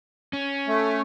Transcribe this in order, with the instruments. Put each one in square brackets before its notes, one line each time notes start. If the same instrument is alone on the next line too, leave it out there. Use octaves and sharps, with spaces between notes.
[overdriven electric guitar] C#4
[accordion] A3